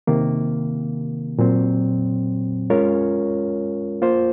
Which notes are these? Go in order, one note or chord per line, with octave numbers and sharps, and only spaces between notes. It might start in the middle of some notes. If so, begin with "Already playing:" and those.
C3 D#3 A#3
A#2 F#3 C4
G#3 C#4 F4 A#4 C#5
A#3 F4 C5